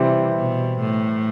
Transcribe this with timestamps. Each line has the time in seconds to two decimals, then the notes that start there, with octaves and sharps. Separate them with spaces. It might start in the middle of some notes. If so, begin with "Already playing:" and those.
Already playing: C3 E3 G3 C4 E4
0.36 B2
0.80 A2